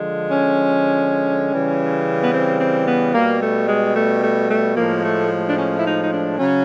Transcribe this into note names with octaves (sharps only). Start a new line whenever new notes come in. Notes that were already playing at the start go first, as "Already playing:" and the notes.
Already playing: D3 F3 G#3
C#4
C#3 E3 G3
B3
C4
C4
B3
B2 G3 A#3
A3
G#3
A3
A3
A3
A2 F3 G#3 A#3
A3
D4
C#4
E4
D#4
D#4
D4
C#3 F#3 C#4